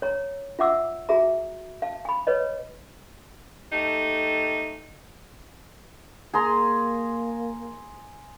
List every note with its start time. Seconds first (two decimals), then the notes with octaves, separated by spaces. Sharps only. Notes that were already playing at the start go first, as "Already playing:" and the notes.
0.02 C#5 A#5
0.59 F4 E5 F#5 D6 E6
1.09 F#4 G#4 E5 A#5
1.82 F5 A5
2.05 G#5 B5
2.27 B4 C#5 D#5
3.71 A3 D#4 G4 A4
6.34 A#3 G#4 A#5 C6